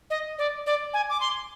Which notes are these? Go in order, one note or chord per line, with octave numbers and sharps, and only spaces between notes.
D#5
D5
D5
G#5
D6
C6